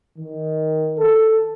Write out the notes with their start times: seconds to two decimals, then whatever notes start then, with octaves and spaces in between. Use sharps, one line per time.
0.18 D#3
0.98 A4